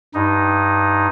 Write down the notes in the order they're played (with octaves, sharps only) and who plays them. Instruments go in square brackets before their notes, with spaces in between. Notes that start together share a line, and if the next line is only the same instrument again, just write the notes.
[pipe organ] G2 D#4